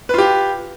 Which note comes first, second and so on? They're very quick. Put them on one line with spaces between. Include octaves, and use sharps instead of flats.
B4 F4 G4